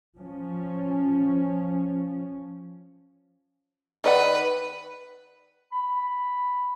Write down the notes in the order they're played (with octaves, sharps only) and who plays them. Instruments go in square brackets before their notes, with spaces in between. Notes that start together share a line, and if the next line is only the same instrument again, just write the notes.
[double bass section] F3 C#4
[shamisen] D#3 D5 F#5 [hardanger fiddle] B4
[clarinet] B5